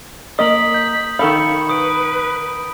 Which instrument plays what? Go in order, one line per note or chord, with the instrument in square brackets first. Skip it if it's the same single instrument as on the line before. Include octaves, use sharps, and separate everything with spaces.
[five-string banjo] A#3 D#5 [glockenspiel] D#6 F#7 [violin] B6
[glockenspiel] G6
[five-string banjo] D#3 A4 F5 [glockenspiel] B5 [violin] C#6
[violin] B4 [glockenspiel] D#6 D7